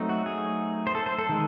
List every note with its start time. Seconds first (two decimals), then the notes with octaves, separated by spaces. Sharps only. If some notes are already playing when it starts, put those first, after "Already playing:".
Already playing: F#3 A3 C4 D#4
0.09 F#4
0.26 G#4
0.87 C5
0.95 A4
1.06 C5
1.19 A4
1.29 D#3 G#3